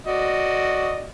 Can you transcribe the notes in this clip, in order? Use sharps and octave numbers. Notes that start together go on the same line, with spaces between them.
F#4 D5 D#5